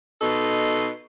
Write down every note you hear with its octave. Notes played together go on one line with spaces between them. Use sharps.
B2 D#4 A4 C6